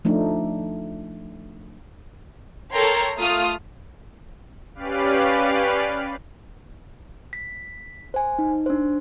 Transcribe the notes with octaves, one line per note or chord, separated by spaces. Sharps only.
F3 A3 D4 D#4
A4 A#4 C#5 G5 A#5 C6
A3 F4 D#6 F6
C#4 G4 B4 D5 F5
B6
C5 G#5
D#4
D4 C5